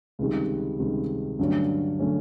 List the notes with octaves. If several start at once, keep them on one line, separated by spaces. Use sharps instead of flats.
C#2 C3 D#3 G3
C#2 C3 D#3 G3
G2 D3 F#3 A3 C#4
D3 F#3 A3 C#4